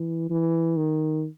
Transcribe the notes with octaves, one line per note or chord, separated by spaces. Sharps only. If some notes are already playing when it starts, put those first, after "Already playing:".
Already playing: E3
E3
D#3